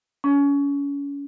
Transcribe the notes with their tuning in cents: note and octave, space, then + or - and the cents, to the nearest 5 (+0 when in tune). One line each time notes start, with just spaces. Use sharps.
C#4 +30